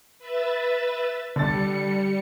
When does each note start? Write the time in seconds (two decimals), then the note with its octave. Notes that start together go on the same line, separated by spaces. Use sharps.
0.19 B4 E5 A6
1.36 D3 G3 A6 C#7